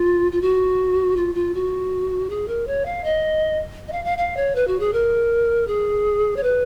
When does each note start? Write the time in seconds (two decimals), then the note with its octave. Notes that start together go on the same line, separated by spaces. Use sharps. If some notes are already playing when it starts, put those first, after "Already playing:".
Already playing: F4
0.32 F4
0.42 F#4
1.17 F4
1.35 F4
1.54 F#4
2.30 G#4
2.48 A#4
2.67 C#5
2.86 F5
3.04 D#5
3.88 D#5
3.92 F5
4.05 F5
4.18 F5
4.37 C#5
4.55 B4
4.68 F#4
4.80 G#4
4.93 A#4
5.68 G#4
6.37 C#5
6.43 B4